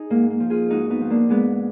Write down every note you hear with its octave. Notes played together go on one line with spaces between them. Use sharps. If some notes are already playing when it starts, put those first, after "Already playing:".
Already playing: D#4 G#4
G#2 A#3
A#3
F3
F4 G#4
G#2 D#4 F#4
B3 D#4
F3 B3
A#3 D4
G#2 G#3 B3